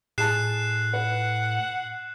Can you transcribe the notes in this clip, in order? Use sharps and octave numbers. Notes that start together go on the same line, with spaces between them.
A2 G#4 A5 F#6 C7 E7
B4 F#5